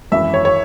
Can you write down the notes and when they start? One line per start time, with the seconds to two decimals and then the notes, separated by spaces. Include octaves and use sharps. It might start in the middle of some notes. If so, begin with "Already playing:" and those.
0.12 G#1 F#2 E3 E5
0.34 C#5
0.45 C#5